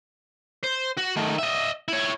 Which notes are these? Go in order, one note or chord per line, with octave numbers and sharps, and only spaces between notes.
C5
F#4
D#3 A3
D#5 E5
E4 C#5